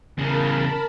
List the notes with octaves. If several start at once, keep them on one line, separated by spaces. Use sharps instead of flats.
E2 C#3 A#4 A5 B5